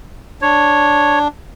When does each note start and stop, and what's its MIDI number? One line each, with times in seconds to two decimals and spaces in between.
0.42 1.28 62
0.42 1.19 73